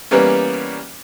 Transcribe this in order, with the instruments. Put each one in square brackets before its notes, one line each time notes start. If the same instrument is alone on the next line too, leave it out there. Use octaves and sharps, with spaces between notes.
[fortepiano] E3 G3 A#3 B3 C#4